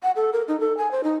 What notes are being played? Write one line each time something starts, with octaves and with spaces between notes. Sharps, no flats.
F#5
A4
A#4
D#4
A4
G#5
C5
D#4